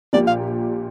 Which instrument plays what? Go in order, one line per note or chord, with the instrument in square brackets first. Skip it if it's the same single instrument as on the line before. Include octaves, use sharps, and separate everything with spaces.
[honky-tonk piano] A#1 A#2 A#3 G4 [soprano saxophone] D5
[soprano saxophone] F5